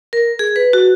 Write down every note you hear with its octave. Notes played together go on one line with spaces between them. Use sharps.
A#4
G#4
B4
F#4